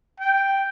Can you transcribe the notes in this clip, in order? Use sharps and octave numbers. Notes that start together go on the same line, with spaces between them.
G5